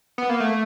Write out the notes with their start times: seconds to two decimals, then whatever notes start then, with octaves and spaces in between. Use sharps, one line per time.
0.18 B3
0.29 A#3
0.40 A3